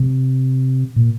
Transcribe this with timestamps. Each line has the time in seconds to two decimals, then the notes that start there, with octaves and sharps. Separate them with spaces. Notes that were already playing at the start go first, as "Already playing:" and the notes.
Already playing: C3
0.96 A#2